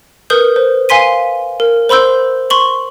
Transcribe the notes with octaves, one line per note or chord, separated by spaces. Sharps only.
A#4 B4 D#6 G6
C5
F5 G#5 C6 B6 D#7
A#4
C5 B5 C6 E6 G6
C6 C#6 F#7